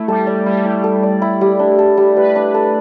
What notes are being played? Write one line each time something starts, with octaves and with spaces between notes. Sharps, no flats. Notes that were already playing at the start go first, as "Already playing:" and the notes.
Already playing: A3 E4
G3 A4
D5
G3 E4
A3 E4
A4
D5
E4
G3
D4
A4
G3
G3 B4
D4
A4